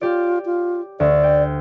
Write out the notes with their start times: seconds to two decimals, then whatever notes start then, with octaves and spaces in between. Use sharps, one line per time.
0.01 F4 G4 D5
0.46 F4
1.00 D2 D5
1.23 G5